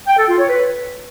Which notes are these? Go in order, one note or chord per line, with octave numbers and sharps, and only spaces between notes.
G5
A4
F4
C#5
B4